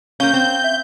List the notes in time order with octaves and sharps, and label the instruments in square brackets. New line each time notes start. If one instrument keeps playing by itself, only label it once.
[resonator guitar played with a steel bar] A#3 C#4 [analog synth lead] F5 [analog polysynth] G6
[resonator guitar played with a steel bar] C4
[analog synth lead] E5